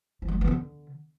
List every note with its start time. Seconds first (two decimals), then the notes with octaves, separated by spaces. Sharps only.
0.22 F3
0.28 G3
0.35 A#3
0.41 B3
0.48 D3